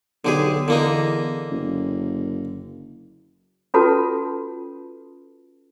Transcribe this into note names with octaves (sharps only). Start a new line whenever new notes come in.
B1 D3 G4 G#4
E2 D3 A#3 D#4
F#1
C#4 F4 F#4 A4 B4 A5